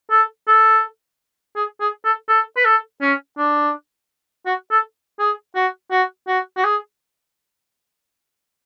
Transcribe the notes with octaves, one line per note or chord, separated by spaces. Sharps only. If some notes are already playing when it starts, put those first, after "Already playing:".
A4
A4
G#4
G#4
A4
A4
B4
A4
C#4
D4
F#4
A4
G#4
F#4
F#4
F#4
F#4
G#4